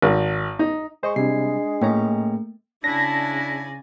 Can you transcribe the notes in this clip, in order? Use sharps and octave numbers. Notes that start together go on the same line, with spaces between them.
G#1
D#4
G#3 C5 D#5 C#6
C3 G3 D4 C7
A2 A3 A#3 C#4 G5 A#5
C#3 D4 E4 D5 G#5 A#6